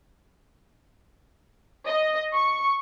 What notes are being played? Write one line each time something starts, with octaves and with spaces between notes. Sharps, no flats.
D#5
C#6